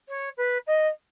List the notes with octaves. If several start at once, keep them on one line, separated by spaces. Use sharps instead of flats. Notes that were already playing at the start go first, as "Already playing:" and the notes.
C#5
B4
D#5